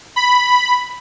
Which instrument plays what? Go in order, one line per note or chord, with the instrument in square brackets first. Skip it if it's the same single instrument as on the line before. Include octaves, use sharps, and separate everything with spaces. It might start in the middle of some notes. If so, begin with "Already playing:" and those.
[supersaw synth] B5